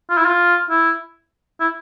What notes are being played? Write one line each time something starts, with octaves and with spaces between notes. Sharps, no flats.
F4
E4
F4
E4
E4